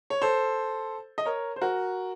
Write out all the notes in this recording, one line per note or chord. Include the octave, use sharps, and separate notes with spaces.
C#5
A4 C5
D#5
A#4 C#5
C5
F#4 A#4